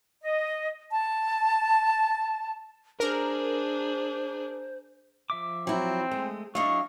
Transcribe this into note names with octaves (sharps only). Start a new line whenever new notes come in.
D#5
A5
D4 G#4 A#4 C5
F3 E5 D6
F#3 C4 E4
G#3 A3 G#4
F#3 D4 E4 D#5 F5 C#6